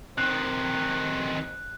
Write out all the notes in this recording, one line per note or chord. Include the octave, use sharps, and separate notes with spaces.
C3 D#3 C5 F#6